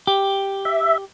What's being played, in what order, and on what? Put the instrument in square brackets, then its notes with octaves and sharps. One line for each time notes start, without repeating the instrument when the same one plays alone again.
[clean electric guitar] G4
[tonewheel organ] E5